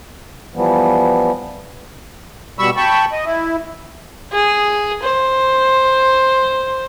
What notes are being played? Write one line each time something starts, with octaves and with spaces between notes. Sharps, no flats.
E3 F3 G3 B3
B2 G3 B5 C#6 E6
G5 A5 B5 C#6
D#5
E4
G#4
C5